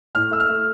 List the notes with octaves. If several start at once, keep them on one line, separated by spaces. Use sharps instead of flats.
A2 F6
A3 E6
F6
A3